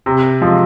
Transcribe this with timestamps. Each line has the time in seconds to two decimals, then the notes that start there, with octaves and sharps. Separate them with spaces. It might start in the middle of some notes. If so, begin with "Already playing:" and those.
0.06 C3
0.41 F3 G#3